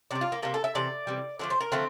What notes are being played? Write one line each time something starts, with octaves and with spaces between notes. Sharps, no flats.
C3 G3 D5
F4
A#3
C3 G3 A#3
A4
E5
C3 E3 D5
C3 E3 G3
D3 F3 A3 D5
C5
A#4
D3 F3 A3 C4